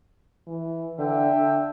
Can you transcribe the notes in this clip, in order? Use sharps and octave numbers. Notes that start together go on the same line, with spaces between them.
E3
D3 E5 G5
D4